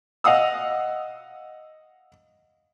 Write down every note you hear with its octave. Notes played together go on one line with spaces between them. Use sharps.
D#5 F5 F#5 D#6 E6